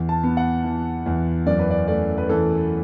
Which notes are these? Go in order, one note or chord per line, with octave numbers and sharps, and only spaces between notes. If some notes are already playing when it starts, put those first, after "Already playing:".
Already playing: E2
A5
B3
F#5
E3
E2
F#2 D5
B4
D5
A3 D5
B4
E3 A4